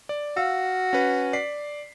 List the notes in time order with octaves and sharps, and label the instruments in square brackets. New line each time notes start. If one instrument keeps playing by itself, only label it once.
[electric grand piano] D5
[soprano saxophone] F#4 [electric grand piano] F5 E6
[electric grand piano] C#4 B4
D5 B6 C7